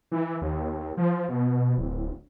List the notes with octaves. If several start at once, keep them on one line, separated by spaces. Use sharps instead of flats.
E3
D#2
F3
B2
D1